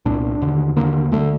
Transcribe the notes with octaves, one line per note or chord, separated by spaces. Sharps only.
C2 A#2 D4
D#2 D3
D#2 D3 A#3
D2 D3 A3